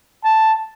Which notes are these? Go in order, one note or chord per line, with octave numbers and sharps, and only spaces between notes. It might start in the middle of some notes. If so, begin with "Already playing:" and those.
A5